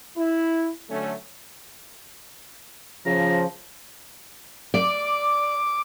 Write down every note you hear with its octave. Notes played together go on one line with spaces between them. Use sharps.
E4
D3 F#3 A3 C#4
C#3 F3 A#5
D5 D6